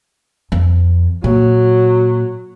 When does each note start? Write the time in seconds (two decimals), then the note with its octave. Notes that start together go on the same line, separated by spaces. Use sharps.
0.52 F2
1.24 A#2 F#3